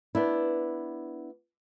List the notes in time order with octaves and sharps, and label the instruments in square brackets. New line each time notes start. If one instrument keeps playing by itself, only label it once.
[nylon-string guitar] B3 D4 E4